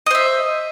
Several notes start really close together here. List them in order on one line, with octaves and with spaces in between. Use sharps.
D#5 C5 E5